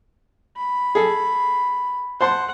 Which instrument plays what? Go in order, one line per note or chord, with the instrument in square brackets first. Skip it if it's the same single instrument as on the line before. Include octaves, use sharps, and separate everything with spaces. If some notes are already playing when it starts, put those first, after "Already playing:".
[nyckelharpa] B5
[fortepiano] G#4 A4
[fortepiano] C5 A5 C6 [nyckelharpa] F#5